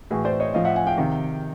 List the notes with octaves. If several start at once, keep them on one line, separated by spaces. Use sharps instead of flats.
A2 E3 F#4 G#4
C5 D5
C#5 D#5
A2 F3 D#5 F5
E5 F#5
F#5 G#5
F5 G5
C3 D#3